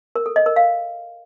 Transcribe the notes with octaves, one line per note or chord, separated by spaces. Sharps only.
A#4
A4
D#5
A#4
F5